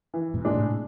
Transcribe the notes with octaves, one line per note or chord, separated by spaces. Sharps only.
E3
G#2 B2
G#3 D4
A2 C3